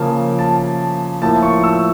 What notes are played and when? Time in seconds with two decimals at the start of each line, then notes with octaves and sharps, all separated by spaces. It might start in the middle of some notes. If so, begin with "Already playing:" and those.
Already playing: C#3 F3 A#3 C#4 A5
0.39 A5
1.22 A2 F3 A#3 A5
1.43 C#6
1.63 E6